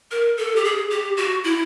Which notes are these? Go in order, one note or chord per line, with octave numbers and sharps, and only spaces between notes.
A#4
A4
G4
G#4
G4
F#4
E4